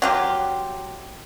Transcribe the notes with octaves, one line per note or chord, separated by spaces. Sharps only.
F#3 F4 G4